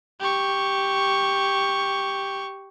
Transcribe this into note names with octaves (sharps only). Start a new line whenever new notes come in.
G4 C#6